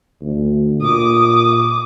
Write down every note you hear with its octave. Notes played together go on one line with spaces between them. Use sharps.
D2
A#2 D6 D#6